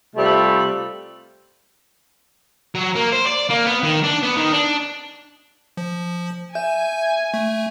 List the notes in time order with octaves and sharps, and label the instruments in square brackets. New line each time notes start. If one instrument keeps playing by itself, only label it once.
[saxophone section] C3 G3 A3 C4 F4
[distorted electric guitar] F#3
A#3
C5
D5
A#3
B3
D#3
D4
B3
D#3
D4
[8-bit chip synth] F3
[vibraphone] E5 [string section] G#5 [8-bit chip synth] G6
[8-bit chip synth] A3